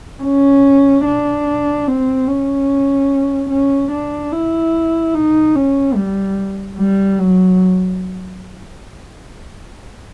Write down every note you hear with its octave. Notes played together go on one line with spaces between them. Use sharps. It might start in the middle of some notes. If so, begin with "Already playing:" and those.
C#4
D4
C4
C#4
C#4
D4
E4
D#4
C#4
G3
G3
F#3